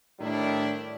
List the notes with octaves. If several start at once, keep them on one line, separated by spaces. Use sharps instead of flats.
A2 D#3 G3 D4 E4